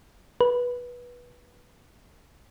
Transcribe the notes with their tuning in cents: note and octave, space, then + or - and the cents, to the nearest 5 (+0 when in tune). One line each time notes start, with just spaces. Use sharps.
B4 -15